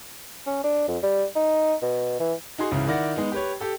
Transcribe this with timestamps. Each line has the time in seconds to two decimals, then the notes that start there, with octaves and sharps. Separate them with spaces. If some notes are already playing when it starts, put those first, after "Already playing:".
0.47 C#4
0.64 D4
0.88 F2
1.03 G3
1.36 D#4
1.82 B2
2.20 E3
2.58 D#4 F#4 G#4 C6
2.71 C#2 G#2 C#3 E3
2.87 D#3 E4 D5 F#5 A#6
3.16 G#3 B3 D#4
3.32 G4 B4 C#5
3.61 G4 A4